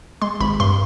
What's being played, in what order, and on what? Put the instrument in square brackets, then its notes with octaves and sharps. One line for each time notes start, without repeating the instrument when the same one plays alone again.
[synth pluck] G#3 C6
G#1 B5
G2 C6